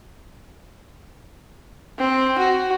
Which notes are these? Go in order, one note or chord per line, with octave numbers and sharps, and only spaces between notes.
C4
F#4